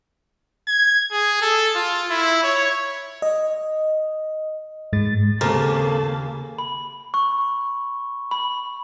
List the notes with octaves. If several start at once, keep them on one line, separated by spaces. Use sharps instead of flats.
G#6
G#4
A4
F4
E4
C#5
D#5
G#2 G#3 A6
D#2 C#3 A#3 C4 G4 A4 A#4 A5
B5
C#6
B5